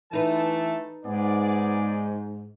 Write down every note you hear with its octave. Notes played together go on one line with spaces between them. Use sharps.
E3 A3 D#4 A4 B4 A5
G#2 B3 G#4 D5